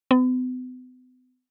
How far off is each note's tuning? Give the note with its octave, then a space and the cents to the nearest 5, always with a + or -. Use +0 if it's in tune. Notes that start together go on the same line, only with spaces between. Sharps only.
B3 +45